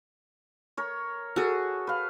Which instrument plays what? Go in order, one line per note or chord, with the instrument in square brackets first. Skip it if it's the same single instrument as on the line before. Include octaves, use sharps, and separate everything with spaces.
[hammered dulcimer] A#4 C#5
[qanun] F#4 G#4 [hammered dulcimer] A4
[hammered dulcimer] B4 F5